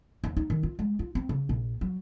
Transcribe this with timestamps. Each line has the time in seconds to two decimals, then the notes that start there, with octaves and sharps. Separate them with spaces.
0.24 D#2
0.37 D#4
0.50 D#3
0.63 F4
0.79 G#3
0.99 F4
1.15 C4
1.29 C#3
1.49 A#1
1.81 F#3